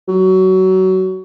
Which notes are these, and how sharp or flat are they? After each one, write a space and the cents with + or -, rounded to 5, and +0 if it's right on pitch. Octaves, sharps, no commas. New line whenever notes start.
F#3 +20